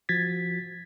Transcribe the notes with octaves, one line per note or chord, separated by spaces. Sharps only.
F3 F#4 G#6 A6 B6